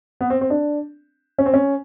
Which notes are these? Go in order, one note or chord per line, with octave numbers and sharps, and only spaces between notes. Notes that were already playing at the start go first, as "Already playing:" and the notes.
B3
C4
C4
D4
C#4
C4
C#4